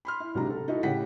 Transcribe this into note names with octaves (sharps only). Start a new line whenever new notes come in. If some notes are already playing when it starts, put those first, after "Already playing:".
B5 C6 F6
E4
B1 C3 F#3 G#3 D4 A#5
A4
D#4 E4 F#4 A4
A2 C#3 G4 F#5 G5 B6